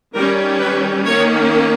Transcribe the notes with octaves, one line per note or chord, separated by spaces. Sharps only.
D#3 G3 C#4 A#4
B4
D#3 A#3 C#4 C#5